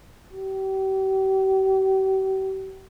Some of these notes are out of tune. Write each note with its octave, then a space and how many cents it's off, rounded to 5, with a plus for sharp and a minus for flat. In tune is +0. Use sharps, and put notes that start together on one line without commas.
G4 -40